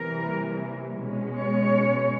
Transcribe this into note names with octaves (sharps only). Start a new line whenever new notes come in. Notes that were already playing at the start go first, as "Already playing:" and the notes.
Already playing: C3 E3 G3 A#3 A#4
B2 G#3 C#4
C#5